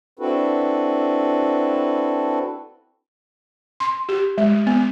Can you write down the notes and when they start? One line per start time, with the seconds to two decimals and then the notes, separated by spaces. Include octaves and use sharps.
0.19 C4 D4 E4 F#4 A4 B4
3.80 C6
4.09 G4
4.38 G#3
4.67 B3